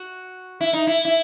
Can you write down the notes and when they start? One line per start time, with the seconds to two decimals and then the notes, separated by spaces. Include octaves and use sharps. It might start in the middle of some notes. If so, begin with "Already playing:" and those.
Already playing: F#4
0.61 E4
0.73 D#4
0.87 E4
1.05 E4